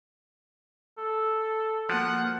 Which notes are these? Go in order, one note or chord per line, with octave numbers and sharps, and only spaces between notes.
A4
F3 A#3 F#4 F#5